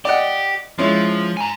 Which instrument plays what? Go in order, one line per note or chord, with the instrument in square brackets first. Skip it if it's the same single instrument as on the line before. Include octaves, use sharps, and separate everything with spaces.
[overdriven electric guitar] G4 [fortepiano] D5 D#5 F#5
[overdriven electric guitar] F3 [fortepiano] G#3 C#4 E4
[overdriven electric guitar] G#5 A#5